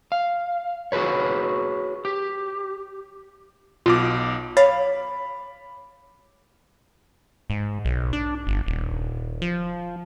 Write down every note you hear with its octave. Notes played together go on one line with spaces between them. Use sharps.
F5
F#4 G#4 A4 B4 C#5
G4
B1 B2 F4 D6
C#5 F5 B5
G#2
B1
D4
G1
D#1
F3